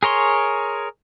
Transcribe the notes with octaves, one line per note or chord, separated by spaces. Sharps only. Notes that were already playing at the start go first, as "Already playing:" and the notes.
G#4 A#4 C#5 C6